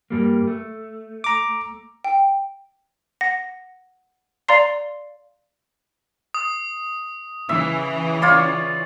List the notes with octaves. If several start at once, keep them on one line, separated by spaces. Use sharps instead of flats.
G2 G3 A#3
A3
A#5 D6
G5
F#5 A#6
D5 F5 A#5 C6 C7
D#6
C#3 E3 E5
F4 C#5 D5